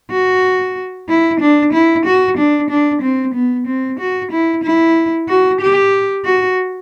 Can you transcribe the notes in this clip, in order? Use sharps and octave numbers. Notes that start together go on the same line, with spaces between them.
F#4
E4
D4
E4
F#4
D4
D4
C4
B3
C4
F#4
E4
E4
F#4
G4
F#4